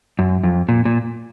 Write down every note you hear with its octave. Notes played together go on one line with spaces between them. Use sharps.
F#2
F2
A#2
A#2